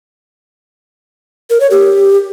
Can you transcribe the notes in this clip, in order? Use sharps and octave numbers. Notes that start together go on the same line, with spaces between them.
A#4
C#5
G4